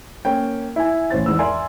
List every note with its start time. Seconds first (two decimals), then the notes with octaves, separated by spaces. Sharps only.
0.25 A#3 C#4 G5
0.76 E4 G#5
1.10 A1 C#4 C5 A6
1.26 E2 G#2 E6
1.39 A#4 D5 E5 G#5 C6